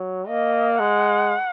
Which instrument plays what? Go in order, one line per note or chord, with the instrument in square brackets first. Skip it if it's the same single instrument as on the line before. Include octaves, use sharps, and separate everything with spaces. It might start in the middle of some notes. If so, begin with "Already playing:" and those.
Already playing: [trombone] F#3
[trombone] A#3 [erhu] D#5
[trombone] G#3 [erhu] F#5